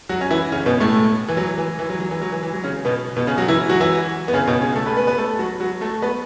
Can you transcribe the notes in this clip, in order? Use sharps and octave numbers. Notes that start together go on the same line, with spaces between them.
F#3 F#4
C#4
E3 E4
C#3 C#4
B2 B3
A2 A3
E3
F#3
E3
E3
F#3
F#3
E3
F#3
E3
E3
F#3
C#3 C#4
B2 B3
B2 B3
C#3 C#4
F#3 F#4
E3 E4
F#3 F#4
E3 E4
B3
C#3 C#4
B2 B3
C#3 C#4
A3 A4
B3 B4
B3 B4
B3 B4
A3 A4
F#3 F#4
F#3 F#4
A3 A4
B3 B4